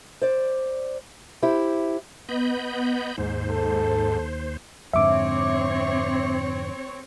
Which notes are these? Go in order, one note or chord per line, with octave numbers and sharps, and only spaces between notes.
C5 D5
E4 G4 C5
B3 D#5 B5 G6
D#2 G#2 C5
A4
F2 G#2 D3 C4 C#5 E5 D6